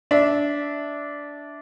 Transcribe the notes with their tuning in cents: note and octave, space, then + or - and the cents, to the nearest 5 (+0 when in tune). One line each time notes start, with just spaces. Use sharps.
D4 -15 E5 -15